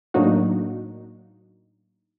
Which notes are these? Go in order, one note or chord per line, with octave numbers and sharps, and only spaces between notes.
A2 F#3 A#3 D4 D#4 F#4